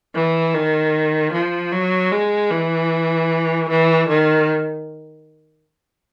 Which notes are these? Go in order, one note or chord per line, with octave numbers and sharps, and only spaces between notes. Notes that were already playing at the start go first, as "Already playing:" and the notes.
E3
D#3
F3
F#3
G#3
E3
E3
D#3